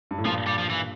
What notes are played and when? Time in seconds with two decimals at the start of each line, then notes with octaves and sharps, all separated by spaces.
0.11 G2
0.18 A2
0.25 G2 A#2 F3
0.47 G3
0.58 F3
0.70 E3